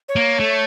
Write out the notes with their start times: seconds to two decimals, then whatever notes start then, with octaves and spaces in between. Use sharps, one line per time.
0.09 C#5
0.16 A#3
0.40 A3